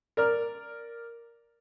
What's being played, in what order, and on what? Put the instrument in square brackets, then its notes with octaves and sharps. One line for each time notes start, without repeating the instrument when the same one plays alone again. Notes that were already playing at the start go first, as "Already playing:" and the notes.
[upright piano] A#4 D5 F6